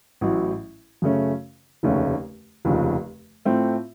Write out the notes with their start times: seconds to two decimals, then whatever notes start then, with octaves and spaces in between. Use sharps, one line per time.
0.21 A1 A2 F#3
1.02 F#2 C#3 A3 C#4
1.83 F1 D#2 C#3 A3 C#4
2.65 F1 D#2 C#3 F3
3.45 A2 A3 C4 F4